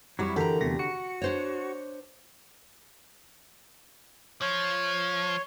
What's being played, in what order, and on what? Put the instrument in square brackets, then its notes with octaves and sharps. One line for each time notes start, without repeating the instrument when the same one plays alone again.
[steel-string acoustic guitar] F2 E4 [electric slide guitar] F#3 G3 C#5
[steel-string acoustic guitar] D3 A#5 [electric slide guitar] E3 G4 [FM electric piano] F#4 A4 A#4
[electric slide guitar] E2 A3 [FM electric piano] C3 G4 A#6
[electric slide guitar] F#4 [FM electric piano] C#7
[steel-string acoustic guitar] D4 C5 C#5
[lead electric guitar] F3 [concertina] C#5